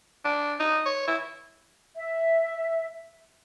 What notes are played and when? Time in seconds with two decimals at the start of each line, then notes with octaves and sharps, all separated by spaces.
0.25 D4
0.60 D#4
0.85 C#5
1.07 E4
1.96 E5